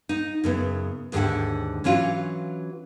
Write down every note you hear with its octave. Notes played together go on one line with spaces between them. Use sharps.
D#4
F#2 C#3 B3
D#2 G#2 D3 G4 E5 F#5
E3 F#3 C#4 F4 F#4